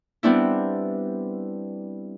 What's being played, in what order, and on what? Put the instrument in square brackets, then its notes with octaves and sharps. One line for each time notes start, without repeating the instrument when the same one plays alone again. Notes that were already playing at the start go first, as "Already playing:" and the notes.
[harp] G3 B3 C4 D4 E4